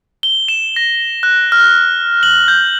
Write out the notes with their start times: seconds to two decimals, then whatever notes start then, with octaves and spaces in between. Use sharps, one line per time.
0.23 G7
0.48 E7
0.76 A#6
1.23 F#6
1.52 F6
2.23 F#7
2.48 G6